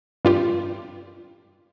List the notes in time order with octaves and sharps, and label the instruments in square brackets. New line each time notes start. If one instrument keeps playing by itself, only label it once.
[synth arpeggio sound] G2 F4 G4